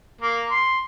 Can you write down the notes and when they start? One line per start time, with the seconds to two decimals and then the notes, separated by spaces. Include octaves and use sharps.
0.21 A#3
0.51 C6